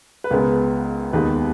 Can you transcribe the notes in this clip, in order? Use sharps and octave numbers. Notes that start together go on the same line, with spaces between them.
B4
C#2 C#3 G#3 B3 A#4
D#2 D#3 G#3 B3 B4